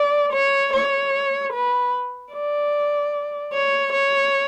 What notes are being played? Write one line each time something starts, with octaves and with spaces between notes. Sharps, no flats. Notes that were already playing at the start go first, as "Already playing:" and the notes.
Already playing: D5
C#5
C#5
B4
D5
C#5
C#5